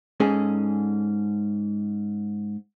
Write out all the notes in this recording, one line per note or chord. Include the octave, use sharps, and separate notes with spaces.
G#2 C#4 G#4 A4